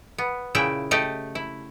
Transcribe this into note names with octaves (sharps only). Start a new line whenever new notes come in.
B3
A#2 C#3 E4 E5 G5
A3 G4 D#5
E4